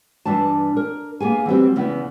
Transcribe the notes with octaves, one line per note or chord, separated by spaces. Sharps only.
G2 E3 D4 A5
A#4
A#3 B3 G#4 G#5
E3 F#3 G3 C4
E2 C#3 B3 E4